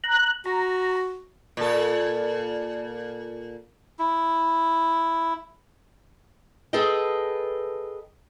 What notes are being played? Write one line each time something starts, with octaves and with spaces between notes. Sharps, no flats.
A#5 F#6
F#4 A#5
A#2 A4
E4
G#4 A4 B4 D#5 G5